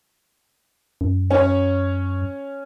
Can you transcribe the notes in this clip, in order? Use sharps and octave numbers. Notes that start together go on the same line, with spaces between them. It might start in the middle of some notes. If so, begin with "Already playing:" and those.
F#2
C#4 C#5